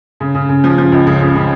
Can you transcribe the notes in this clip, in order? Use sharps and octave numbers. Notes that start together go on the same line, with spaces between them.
C#3
C#3
C#3
F3
F3
C#2
C#3
C#3
C#3